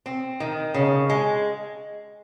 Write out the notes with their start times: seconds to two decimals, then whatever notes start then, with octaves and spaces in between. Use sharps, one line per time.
0.06 C4
0.40 D#3
0.74 C#3
1.10 G#3